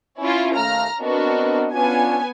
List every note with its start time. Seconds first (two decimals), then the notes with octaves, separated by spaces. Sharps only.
0.21 C#4 E4 F4
0.57 D#2 A3 F5 A#5 F6
1.01 B3 C4 D4 F#4 A#4 D#5
1.74 B3 C#4 D4 F4 G#5